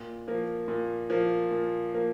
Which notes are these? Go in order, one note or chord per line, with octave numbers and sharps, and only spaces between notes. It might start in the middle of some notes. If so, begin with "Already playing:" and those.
Already playing: A#2
F3 A#3
A#2
F3 A#3
A#2
F3 A#3